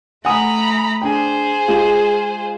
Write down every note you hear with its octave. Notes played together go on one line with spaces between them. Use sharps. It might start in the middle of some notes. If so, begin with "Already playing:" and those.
A3 F#5 G#5 A#5 B5 D#6
D4 G#4 C5 G5
G#3 F4